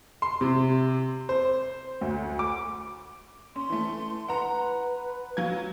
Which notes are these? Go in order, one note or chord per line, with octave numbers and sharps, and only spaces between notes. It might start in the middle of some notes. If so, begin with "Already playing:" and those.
C6
C3
C5
D2
D6
C#4 C6
E3 A3
B4 F#5 A#5
F#3 F5 G#6